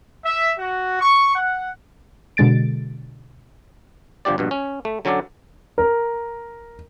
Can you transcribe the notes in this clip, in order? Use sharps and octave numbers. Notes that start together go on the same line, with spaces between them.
E5
F#4
C#6
F#5
B2 D3 G#3 A6 D7
G1 F3 D4 G4 D5
A#1 G2 B2
C#4
A3
D3 F#3 C#4 A4 D5
A#4